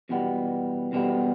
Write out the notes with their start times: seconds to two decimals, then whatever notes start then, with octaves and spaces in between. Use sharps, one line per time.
0.09 E2 B2 G3 B3
0.92 E2 B2 G3 B3